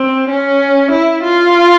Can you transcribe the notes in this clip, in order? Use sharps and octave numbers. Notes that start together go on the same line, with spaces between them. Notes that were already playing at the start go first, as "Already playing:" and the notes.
Already playing: C4
C#4
E4
F4